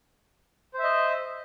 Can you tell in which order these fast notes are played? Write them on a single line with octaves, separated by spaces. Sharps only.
C5 E5 D#5